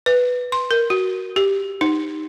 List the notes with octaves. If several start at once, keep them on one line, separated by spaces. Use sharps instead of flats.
B4
C6
A#4
F#4
G4
D#4